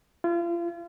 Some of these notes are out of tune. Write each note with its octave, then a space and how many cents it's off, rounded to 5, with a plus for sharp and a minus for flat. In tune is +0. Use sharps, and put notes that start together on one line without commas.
F4 -35